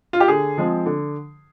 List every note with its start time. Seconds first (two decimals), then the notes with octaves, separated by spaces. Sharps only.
0.13 F4
0.20 G4
0.28 D3 G#4
0.58 F3 G#3 C4
0.86 D3